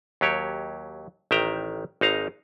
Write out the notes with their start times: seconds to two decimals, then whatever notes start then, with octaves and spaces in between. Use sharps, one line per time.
0.21 D#2 F#3 G4 C#5
1.31 A1 D#3 E5 G5 A#5
2.01 G#1 D#4 F5 A#5